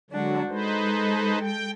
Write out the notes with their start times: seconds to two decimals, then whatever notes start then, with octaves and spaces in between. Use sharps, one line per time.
0.11 D3 F#3 G#3 D4 F#4
0.49 G#3 D#4 A4 B4 C5
1.40 G5